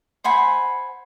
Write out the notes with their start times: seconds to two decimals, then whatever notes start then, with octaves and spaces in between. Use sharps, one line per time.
0.24 C5 F#5 G#5 B5